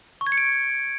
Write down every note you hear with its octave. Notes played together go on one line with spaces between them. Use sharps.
C#6
G#6
C#7
D7